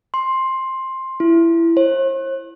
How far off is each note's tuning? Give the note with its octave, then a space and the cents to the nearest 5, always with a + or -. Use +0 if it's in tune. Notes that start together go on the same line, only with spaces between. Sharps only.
C6 +10
E4 +20
C5 +45